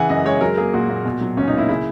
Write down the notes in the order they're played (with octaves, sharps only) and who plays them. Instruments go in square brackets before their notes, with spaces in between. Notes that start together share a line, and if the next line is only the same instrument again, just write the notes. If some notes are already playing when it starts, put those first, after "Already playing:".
Already playing: [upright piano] C#3 E3 F#5 G#5
F#2 D#5
G#3 C#5
F#3 A#4
A#3 G#4
A#2 F#4
A#2
B2
F#3
C#2 C#4
D#4
A#3 E4
C#3 E4